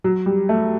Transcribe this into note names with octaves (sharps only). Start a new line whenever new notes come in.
F#3
G3
A3